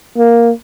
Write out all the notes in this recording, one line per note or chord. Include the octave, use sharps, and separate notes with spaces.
A#3